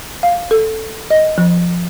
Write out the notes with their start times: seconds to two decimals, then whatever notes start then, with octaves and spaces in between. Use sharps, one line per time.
0.23 F5
0.51 A4
1.11 D#5
1.38 F3